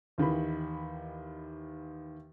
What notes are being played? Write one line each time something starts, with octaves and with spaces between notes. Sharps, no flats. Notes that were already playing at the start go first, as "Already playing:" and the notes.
D#2 D#3 E3 B5